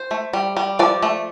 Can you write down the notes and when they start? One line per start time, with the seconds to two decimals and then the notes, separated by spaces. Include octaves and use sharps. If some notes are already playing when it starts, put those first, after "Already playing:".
Already playing: C5
0.11 A3
0.33 G3
0.57 G3
0.79 F3 D5
1.02 A3